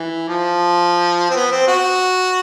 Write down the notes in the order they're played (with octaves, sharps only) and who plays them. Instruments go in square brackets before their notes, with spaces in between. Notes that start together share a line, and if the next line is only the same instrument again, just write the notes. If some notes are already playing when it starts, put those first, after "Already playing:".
Already playing: [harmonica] E3
F3
C4
B3
C4
F#4